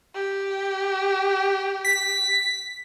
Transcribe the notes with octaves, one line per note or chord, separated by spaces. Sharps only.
G4
B6